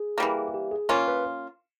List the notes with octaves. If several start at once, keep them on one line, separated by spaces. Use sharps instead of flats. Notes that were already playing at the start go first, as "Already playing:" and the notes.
Already playing: G#4
E3 G3 A#3
G4
G#4
A#3 C#4 F4 A#4
B4